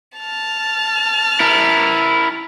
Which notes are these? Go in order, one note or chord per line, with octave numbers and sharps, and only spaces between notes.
A5 F6
E4 A#4